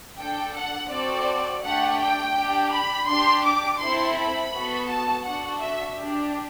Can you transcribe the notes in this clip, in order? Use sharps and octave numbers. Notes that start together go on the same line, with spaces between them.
D4 A4 G5
F#5
C4 F#4 A4 D5
A3 D4 G4 F#5
G5
D4 G4
B5
D4 G4 C6
D6
C4 E4 A4 C6
B5
B3 F#4 A4
A5
D4 F#4 A4 F#5
E5
D4 G4